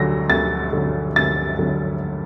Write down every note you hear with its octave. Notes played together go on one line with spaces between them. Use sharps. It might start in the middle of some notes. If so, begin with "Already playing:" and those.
Already playing: D2 D3 F#3 A#6
D2 A6
D3 F#3
D2 A6
D3 F#3